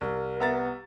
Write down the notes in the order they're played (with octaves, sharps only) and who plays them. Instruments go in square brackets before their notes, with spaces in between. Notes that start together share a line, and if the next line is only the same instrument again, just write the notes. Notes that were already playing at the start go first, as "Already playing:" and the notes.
[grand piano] C2 [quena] A#4
[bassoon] B3 [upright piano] E5 A#5 A6